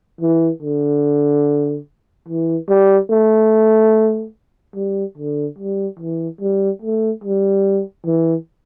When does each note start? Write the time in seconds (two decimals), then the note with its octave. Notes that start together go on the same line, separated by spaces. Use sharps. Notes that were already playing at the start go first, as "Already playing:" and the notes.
0.21 E3
0.62 D3
2.28 E3
2.69 G3
3.10 A3
4.76 G3
5.17 D3
5.58 G3
5.99 E3
6.41 G3
6.82 A3
7.24 G3
8.06 E3